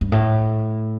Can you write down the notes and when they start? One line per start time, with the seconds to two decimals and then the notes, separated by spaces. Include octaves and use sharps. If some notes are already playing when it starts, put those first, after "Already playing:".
0.01 G2
0.12 A2